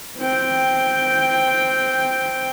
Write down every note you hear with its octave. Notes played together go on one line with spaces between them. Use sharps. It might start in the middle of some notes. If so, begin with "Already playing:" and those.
C4 G5